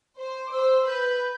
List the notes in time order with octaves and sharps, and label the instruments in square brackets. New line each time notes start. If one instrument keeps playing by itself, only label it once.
[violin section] C5
[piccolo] D6
[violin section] C5 [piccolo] E6
[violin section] B4 [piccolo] G6